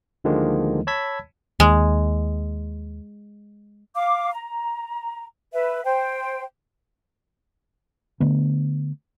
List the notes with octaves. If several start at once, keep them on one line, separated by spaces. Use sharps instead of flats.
D2 D3 D#3 F3 G#3 A#3
C#5 A5 B5 E6 G#6 B6
D#2 G#3
F5 D6
A#5
B4 E5
C5 G5
D3 A3 B3